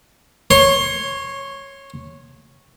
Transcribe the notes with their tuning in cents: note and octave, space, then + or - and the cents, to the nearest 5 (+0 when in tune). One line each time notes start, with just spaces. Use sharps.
C#5 -10 C6 +20